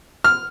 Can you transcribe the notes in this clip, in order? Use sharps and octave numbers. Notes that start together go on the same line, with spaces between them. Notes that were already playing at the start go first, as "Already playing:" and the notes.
F6